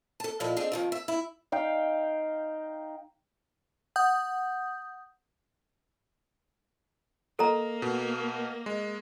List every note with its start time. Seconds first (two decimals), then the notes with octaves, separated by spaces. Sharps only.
0.20 A4 A5
0.40 A#2 F3 D#4 E4 A4
0.57 C4 D4 D#4 G#4
0.72 F2 D#3 F3
0.92 E5
1.08 E4
1.52 D#4 F5 G5
3.96 F#5 D#6 G6
7.39 A#3 A4 D#5 A#5
7.82 B2
8.66 G#3